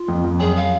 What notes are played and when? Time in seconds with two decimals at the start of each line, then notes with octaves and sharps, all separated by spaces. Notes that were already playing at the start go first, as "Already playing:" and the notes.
Already playing: F4
0.08 F2
0.24 F2
0.40 F#2 G#4
0.56 F5